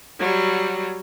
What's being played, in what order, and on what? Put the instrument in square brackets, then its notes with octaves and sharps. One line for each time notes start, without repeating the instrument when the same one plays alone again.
[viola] F#3 G3